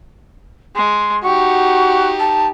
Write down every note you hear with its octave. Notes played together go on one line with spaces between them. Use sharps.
G#3 C6
D#4 F#4 G4 C#6
A5